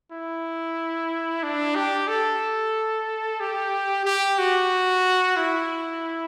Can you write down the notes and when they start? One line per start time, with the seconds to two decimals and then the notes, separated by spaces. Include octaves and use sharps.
0.11 E4
1.43 D4
1.75 G4
2.08 A4
3.40 G4
4.05 G4
4.38 F#4
5.36 E4